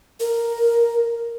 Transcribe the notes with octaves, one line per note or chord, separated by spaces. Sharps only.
A#4